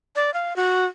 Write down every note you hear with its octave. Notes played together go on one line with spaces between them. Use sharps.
D5
F5
F#4